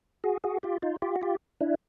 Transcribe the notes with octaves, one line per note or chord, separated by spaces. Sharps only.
F#4 G#4
F#4 G#4
F4 G4
D#4 F4
F4 G4
F#4
F4 G4
D4 E4